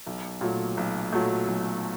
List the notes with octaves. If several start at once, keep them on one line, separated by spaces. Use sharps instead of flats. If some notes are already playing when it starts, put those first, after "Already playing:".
B1
A#2 F#3 A3
B1
A#2 F#3 A3
B1